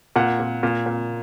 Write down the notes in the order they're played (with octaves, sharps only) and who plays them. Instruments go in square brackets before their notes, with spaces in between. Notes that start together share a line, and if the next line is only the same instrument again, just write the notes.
[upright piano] A#2 F#5
A#2
A#2
A#2